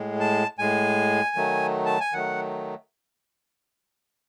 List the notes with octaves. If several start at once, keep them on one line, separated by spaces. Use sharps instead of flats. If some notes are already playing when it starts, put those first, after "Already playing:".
Already playing: A2 G#3
A5
A2 G#3 G#5
D#3 F#3 A3
A5
G#5
D#3 F#3 A3 F#5